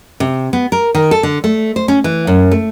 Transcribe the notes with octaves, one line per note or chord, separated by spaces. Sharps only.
C3
B3
A#4
D#3
A4
D3
A3
C5
C#4
E3
F#2
A3